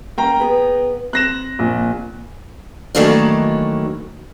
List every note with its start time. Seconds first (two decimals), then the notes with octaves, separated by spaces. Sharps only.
0.18 A#3 C#4 G5 A#5
0.40 B3 G#4 B4
1.13 C4 F#6 A#6 E7
1.59 A#1
2.95 D#3 E3 F#3 A3 A#3 D4